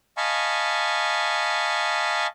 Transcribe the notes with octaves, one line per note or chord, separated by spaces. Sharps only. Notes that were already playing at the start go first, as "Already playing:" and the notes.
D#5 F5 G#5 A5 B5 C#6